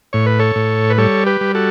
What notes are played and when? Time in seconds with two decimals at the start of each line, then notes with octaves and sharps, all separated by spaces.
0.13 A2 C#5
0.26 B4
0.39 A4 C#5
0.55 A2
0.90 B4
0.98 G3 A4 C#5
1.26 G4 B4
1.41 G3
1.55 F#4 A4